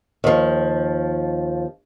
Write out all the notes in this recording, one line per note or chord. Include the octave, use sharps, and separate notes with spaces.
D#2 F3